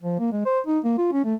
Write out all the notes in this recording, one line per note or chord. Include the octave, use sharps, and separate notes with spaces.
F3
A#3
G#3
C5
D#4
A#3
F4
C#4
A3